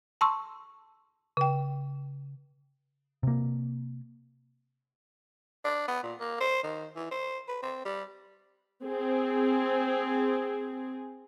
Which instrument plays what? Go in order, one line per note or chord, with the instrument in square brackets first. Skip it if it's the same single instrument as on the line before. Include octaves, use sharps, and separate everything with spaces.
[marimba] A5 C6 C#6 E6
C#3 G5
[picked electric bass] C3 A#3
[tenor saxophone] D4
B3
A#2
A#3
C5
D#3
E3
C5
B4
C4
G3
[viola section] C4 G#4